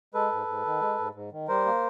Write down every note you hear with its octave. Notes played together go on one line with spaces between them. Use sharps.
G#3 A4 B4
G#2
G#2
D#3
G#3
G#2
G#2
D#3
G3 A#4 C5
A#3